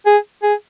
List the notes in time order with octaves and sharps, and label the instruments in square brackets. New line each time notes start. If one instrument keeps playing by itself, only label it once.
[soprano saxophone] G#4
G#4